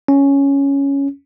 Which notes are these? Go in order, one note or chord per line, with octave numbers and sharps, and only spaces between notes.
C#4